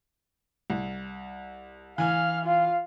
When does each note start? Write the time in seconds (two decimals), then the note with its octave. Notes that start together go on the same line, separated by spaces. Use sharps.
0.70 C2
1.98 E3 F5 G#5 F6
2.45 F4 F5